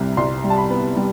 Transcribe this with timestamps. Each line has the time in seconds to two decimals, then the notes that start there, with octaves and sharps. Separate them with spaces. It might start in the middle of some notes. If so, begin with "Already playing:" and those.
Already playing: C2 C3 G3
0.17 C2 C6
0.44 G3
0.50 A5
0.57 B5
0.70 B3
0.96 G3